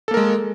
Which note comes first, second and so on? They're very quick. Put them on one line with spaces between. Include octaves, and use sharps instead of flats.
A4 A#3 A#4 G#3